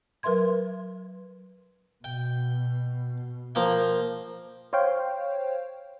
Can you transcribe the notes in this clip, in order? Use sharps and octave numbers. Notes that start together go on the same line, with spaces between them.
F#3 A#4 B4 E5 C6 G#6
B2 G5
F3 A#3 G5
C5 C#5 F5 G5